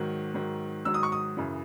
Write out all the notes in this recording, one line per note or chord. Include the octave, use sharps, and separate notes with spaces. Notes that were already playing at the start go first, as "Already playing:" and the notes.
Already playing: G#2 D#3 F#3
G#2 D#3 F#3
G#2 D#3 F#3 E6
D#6
C#6
D#6
F#2 C#3 E3